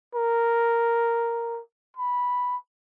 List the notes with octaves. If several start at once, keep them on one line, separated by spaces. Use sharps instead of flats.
A#4
B5